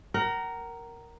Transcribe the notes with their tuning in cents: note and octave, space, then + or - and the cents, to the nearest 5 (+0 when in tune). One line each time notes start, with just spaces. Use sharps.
A#4 +0 F#5 +40